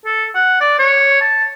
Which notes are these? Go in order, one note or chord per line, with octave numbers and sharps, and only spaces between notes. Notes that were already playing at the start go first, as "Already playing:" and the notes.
A4
F#5
D5
C#5
A5